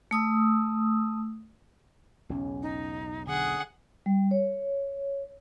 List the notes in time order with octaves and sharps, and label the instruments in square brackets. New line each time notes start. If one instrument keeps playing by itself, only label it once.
[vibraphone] A3 D#6 E6
[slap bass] B1 E2 [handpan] C#3 C#4
[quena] D#4
[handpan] D3 [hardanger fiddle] G#4 F#5 [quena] D#6
[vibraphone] G3
C#5